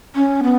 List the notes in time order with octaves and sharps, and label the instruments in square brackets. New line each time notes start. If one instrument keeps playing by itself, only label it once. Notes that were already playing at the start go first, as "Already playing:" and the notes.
[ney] C#4
B3